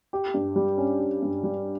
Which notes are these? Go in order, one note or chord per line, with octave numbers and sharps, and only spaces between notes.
G4
G2
G3
C#4
G4
G2
G3